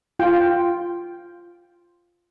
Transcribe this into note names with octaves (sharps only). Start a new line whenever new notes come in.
F4 G5